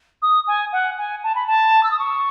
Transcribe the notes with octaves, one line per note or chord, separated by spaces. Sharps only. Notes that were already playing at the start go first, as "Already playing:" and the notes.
D#6
G#5
F#5
G#5
A5
B5
A5
E6
D#6
C#6